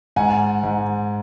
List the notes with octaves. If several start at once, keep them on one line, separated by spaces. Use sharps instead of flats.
G#2 F#5 G#5
G#2